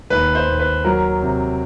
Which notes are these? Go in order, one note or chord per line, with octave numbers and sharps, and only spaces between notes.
D#2 B4
C5
D#2
B4
F#3 A#4
C3